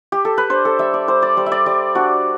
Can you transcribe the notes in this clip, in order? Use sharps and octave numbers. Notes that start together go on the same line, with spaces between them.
G4
A4
B4
D4 C5
A4
G3 E5
D5
G3 C5
D5
G3 C5
E5
D5
G3 D5
D4 F#4